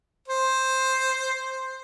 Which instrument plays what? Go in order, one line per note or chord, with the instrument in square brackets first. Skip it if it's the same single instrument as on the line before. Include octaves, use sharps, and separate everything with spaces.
[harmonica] C5